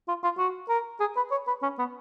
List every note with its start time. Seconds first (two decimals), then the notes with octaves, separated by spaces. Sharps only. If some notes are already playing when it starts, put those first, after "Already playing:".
0.08 F4
0.24 F4
0.38 F#4
0.69 A#4
1.00 G#4
1.16 B4
1.31 C#5
1.47 B4
1.63 C#4
1.79 B3